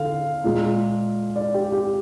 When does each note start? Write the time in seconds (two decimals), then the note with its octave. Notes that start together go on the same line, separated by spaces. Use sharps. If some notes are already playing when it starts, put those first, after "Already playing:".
Already playing: D3 F5
0.44 A#2 G#3
1.36 D5
1.54 G4
1.72 G4